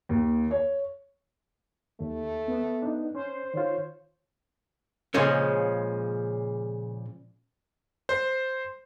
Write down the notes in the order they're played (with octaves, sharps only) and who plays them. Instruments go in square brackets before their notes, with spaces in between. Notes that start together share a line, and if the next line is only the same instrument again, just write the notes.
[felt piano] D#2
C#5
[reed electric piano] D#2 [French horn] A3
[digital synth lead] B3
[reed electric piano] D4 D#4
[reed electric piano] C#4 [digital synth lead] C5
[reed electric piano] D#3 F4 [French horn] C#5
[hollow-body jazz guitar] A#2 C#3 F3 G#3 C#4
[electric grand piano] C5